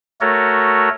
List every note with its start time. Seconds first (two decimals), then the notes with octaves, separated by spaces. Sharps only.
0.21 A3 F#4 A4 A#4 C#5